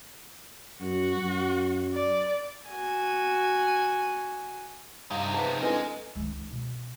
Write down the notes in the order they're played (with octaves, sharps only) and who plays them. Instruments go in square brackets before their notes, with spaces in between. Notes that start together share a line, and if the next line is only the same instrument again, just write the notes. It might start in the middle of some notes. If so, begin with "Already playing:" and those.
[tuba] F#2 [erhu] F#4
[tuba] F#2
[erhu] D5
[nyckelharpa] F#4 G#5
[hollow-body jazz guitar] G2 [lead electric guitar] C3 D#4 [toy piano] F5
[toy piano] G#4 [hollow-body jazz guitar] B4 F#5 A5
[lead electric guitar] G#3 D#5 [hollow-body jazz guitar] C4 A4 [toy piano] D4 E4 B4
[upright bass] C#2 D#3
B2